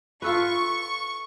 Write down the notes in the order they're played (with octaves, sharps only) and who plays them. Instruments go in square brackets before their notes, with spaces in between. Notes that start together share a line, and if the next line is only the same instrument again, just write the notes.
[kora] F4 A4 B4 [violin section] C#6